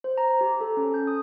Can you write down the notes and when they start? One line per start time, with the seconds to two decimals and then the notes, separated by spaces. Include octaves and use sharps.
0.04 C5
0.18 A#5
0.41 G4
0.61 A4
0.77 C#4
0.94 G6
1.07 D#6